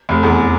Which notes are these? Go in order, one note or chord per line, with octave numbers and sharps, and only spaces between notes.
F1
E2